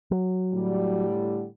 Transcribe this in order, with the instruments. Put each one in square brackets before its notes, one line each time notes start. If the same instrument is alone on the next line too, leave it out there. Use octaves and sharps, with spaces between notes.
[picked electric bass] F#3
[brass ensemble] A2 D3 G3